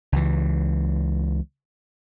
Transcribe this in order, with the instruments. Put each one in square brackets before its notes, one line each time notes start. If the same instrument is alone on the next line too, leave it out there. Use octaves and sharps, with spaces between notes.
[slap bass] C#2 E3